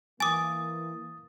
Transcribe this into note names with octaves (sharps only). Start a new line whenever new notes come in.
E3 A#3 G#5 D6 D#6 A6